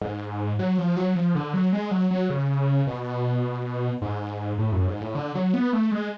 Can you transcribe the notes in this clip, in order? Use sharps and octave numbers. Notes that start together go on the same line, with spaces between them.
G#2
F#3
F3
F#3
F3
D3
F#3
G#3
F#3
F#3
C#3
B2
G#2
A2
F#2
G#2
A2
D3
F#3
B3
A3
G#3